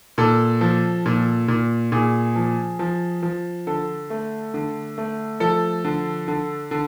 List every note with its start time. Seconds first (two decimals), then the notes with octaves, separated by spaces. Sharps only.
0.18 A#2 A4
0.61 F3
1.06 A#2
1.48 A#2
1.92 A#2 G#4
2.36 F3
2.79 F3
3.23 F3
3.67 D3 A4
4.10 A3
4.54 D3
4.98 A3
5.40 F3 A4
5.84 D3
6.28 D3
6.71 D3